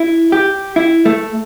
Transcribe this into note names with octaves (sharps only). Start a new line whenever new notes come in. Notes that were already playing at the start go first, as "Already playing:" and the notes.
Already playing: E4
G4
E4
A3